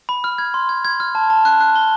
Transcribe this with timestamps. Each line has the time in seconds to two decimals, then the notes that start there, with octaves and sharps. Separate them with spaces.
0.09 B5
0.24 F6
0.38 G#6
0.54 C6
0.69 G#6
0.85 G#6
1.00 F6
1.15 A5
1.30 A5
1.45 F#6
1.60 F#6
1.76 G7